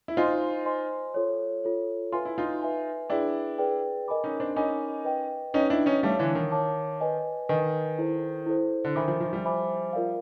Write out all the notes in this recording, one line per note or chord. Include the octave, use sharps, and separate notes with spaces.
E4
D#4 F4 C5 D#5 G#5 C6
C5 D#5 G#5 C6
F4 A4 C#5
F4 A4 C#5
F4 B4 E5 G#5 C6
E4
D#4 F4
B4 E5 G#5 C6
D4 E4 G#4 B4 D5 G5
G#4 B4 D5 G5
A#4 D#5 G#5 B5 D6
C#4 D#4
C4 D4
C#4 D#4 A#4 D#5 G#5 B5 D6
B4 D#5 G5
C#4 D#4 B4 D#5 G5
D4 E4
C#4 D#4
G3 A3 C#5 F5 A5 D6
D3 E3
D#3
C#5 F5 A5 D6
B4 D#5 G#5
D#3 B4 D#5 G#5
E4 A4 C5
E4 A4 C5
D3
D#3 C5 E5 G#5 B5 D6
D#3 F3
D#3 F3
F3 G3
C5 E5 G#5 B5 D6
F4 A#4 D5 F5